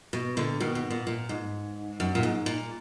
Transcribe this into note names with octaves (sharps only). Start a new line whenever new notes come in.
B2
A#2 D3
B2 D#3
B2
A#2
A#2
G#2
F#2
A#2
G#2
A#2